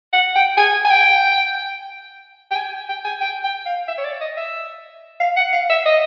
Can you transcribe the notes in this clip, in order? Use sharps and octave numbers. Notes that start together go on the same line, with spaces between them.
F#5
G5
G#5
G#5
G5
G5
G#5
G5
G#5
G5
G5
F5
E5
C#5
D5
D#5
E5
F5
F#5
F5
E5
D#5